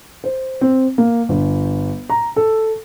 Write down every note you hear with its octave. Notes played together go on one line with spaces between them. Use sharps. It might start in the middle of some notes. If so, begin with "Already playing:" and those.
C5
C4
A#3
G1
A#5
A4